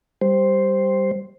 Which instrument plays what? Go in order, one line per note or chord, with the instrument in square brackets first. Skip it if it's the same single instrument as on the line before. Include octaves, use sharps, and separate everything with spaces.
[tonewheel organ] G3 C5